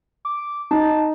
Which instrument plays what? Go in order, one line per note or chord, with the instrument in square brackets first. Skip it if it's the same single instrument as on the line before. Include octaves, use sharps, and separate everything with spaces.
[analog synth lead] D6
[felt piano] D#4 [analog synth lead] A5